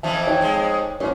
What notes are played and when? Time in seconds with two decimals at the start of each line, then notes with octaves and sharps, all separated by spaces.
0.03 F2 E3 F3 E5 A5
0.27 D#4 C#5 G5
0.41 F2 G#3
1.00 G#2 E3 C#4